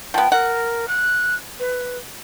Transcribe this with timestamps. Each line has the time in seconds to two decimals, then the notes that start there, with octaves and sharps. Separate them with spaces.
0.14 F3 B3 G5
0.32 A#4 F#5
0.88 F#6
1.59 B4